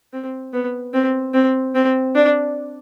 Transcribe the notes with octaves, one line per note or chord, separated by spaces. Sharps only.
C4
B3
C4
C4
C4
D4